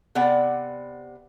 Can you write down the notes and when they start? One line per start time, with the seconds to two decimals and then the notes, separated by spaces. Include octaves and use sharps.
0.15 C3 B3 D5 F#5 G5